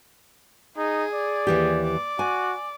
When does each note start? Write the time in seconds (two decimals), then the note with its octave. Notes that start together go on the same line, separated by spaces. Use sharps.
0.77 D#4 G#4
1.14 D5
1.47 D#2 E3 G4
1.84 D5
2.19 F#4 G#5